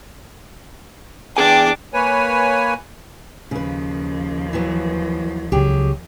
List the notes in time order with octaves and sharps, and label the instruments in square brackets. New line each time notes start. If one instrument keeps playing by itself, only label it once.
[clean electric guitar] E2 G#4 G#5 [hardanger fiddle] D4 D6 [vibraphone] G5
[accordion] A#3 B4 C#5 G#5
[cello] D#2 F3 [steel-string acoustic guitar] C#3 B4
[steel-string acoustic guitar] E3 F#3 B3
[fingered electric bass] C#2 C#3 [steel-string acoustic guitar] F#3 G4 G#4